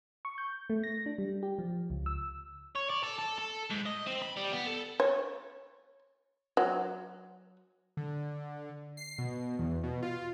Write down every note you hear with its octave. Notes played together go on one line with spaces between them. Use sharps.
C#6
G6
A3
A#6
D4
G3
G4
F3
C#2
E6
C#5
D5
A4
A4
A4
G#2
D#5
C4
B5
G3
B3
A4
C#5
F#3
D3
C7
B2
E2
B2
F4